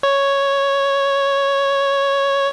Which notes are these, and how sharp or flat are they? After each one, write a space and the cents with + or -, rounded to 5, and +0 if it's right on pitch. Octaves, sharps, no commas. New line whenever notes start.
C#5 +0